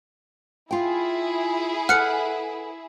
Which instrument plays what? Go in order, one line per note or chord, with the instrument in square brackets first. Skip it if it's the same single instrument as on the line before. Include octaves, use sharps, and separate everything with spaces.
[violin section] E4 G#4 [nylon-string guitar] F4 G5
[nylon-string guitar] A4 B4 F#5 [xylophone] F6 F#6 C#7